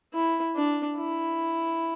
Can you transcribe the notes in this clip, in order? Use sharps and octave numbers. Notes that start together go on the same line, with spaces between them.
E4
D4
E4